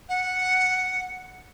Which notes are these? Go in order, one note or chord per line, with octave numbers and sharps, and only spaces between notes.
F#5